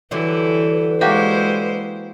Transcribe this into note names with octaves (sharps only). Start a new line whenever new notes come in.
D3 E3 F#3 G3 B4
G#3 A#3 E4 F#4 G4 C5